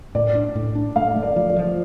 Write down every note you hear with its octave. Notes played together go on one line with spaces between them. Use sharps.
A2 D5
D4
A2
D4
A3 F5
A3
D5
F3
D5
F3